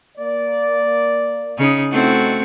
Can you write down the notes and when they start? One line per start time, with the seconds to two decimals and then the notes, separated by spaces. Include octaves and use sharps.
0.18 A#3 D5
1.58 C#3 D#4
1.92 A3 C4 D#4 E4 F#4